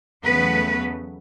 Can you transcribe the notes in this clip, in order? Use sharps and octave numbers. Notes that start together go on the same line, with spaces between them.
E2 C#3 F#3 A3 B3 B4